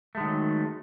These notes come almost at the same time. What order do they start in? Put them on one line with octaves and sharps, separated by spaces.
A3 G#3 D#3 F#3